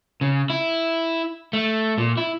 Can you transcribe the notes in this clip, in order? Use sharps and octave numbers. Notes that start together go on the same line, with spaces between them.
C#3
E4
A3
A#2
E4